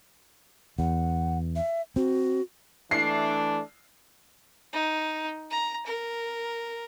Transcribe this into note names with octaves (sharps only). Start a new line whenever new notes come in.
E2 F#5
E5
C4 F#4
E3 A3 D4 C7
D#4
A#5
A#4